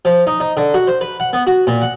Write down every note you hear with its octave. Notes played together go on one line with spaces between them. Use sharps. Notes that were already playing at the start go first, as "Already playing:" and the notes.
F3
D#4
D#4
D3
F#4
C5
B4
F#5
B3
F#4
A#2
F#5